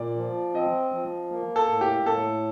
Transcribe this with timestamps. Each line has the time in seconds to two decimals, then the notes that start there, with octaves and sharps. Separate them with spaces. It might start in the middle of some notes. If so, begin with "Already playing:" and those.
Already playing: A#2 D5
0.16 F3
0.55 C4 D#5
0.92 F3
1.31 A#3
1.56 A4
1.69 A2
1.81 G4
2.06 A2 A4